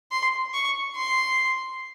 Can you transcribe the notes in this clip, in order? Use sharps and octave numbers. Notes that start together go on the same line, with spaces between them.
C6
C#6
C6